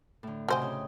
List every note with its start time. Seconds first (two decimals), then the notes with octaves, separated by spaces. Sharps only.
0.23 A2 D3
0.49 C3 F#3 C5 D#5 G5 G#5
0.62 C#3